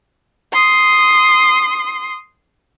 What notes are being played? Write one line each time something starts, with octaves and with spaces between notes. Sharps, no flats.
C6 D#6